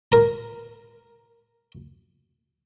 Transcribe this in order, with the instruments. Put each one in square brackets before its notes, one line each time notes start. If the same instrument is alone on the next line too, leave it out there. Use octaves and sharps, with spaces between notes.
[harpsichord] A#4 A#5